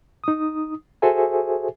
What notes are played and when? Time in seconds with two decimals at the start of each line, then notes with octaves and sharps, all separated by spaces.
0.24 D#4 D#6
1.02 F#4 G#4 A4 C5 E5 G#5